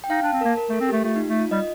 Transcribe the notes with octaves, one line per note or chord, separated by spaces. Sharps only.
G5
D#4 F5
D4 A5
C4
A#3 A#4
A#4
A3
A4
C4
A3 G4
A3 F4
D#4
A3
F4
G3 D#5